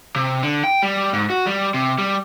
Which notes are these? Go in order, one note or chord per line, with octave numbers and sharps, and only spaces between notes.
C3
D3
G5
G3
G#2
F#4
G3
C3
G3